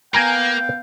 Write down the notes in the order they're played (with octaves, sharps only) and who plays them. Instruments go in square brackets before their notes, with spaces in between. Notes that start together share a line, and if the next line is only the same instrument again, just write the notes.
[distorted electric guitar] A#3 [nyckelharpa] B3 F5 [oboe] G5 [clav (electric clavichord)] G#5 A#5